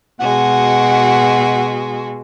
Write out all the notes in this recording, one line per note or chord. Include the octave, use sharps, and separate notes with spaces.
B2 G#3 F#4 F#5